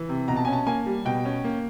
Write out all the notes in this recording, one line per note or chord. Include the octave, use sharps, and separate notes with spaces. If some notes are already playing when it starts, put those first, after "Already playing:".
Already playing: E3
C3
B2 A#5
A5
C#4 G#5
A5
A#3 G#5
G3
B2 G5
C#4
A#3